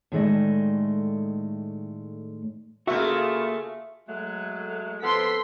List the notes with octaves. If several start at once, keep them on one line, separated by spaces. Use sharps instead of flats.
A2 D#3 G#3 A3 D5 D#5
C#3 A3 A#3 F4 F#4 G#4 E5
F#3 G#3 A3
F3 B3 C4 A4 C6 B6